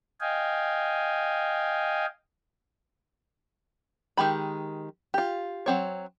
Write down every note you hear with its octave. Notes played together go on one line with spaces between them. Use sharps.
D#5 F5 G5 G#5
D#3 G#3 G4 B5
F4 G4
F#3 C4 C#5